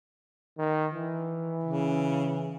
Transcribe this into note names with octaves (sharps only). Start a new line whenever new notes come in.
D#3
E3
C#3